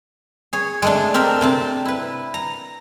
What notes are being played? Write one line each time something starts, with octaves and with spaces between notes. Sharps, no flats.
G#4 C#5
G#3 A3 D4
C4 D4 A#4 E5
C3 C4 A5
E4 B4
A#5